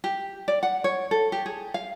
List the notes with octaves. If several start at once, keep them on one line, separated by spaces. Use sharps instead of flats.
G4
D5
F#5
C#5
A4
G4
G#4
F5